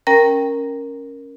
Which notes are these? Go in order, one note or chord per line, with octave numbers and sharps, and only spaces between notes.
C#4 A#4 G5 A#5 A#6